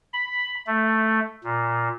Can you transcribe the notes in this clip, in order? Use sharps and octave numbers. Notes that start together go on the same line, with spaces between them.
B5
A3
A#2